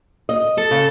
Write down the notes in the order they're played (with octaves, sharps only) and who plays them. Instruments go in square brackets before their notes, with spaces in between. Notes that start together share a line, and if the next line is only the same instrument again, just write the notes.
[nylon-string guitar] D#5
[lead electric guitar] A4
[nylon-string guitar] C#3